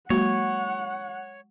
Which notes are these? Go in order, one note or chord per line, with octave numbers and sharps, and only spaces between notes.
F#3 G#3 A#3 F#4 C#5 F#5